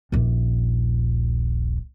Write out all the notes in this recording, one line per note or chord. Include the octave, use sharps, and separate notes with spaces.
D#1 A#1